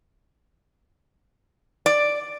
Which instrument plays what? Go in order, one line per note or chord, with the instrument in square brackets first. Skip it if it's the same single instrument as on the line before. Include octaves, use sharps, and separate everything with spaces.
[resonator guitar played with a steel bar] D5